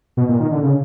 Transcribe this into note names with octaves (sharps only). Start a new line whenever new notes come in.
B2
A#2
D#3
D3
C#3